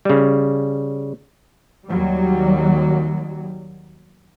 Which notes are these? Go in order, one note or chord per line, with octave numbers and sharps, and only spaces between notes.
C#3 G3
D#2 F#3 G3